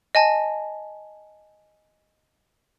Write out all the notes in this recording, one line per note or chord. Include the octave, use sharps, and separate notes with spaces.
D#5 G#5 A5